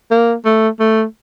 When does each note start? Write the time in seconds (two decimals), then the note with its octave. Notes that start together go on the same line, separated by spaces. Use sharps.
0.11 A#3
0.45 A3
0.79 A3